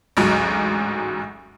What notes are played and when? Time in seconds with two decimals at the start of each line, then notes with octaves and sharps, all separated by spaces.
0.17 A1 D2 G#2 F#3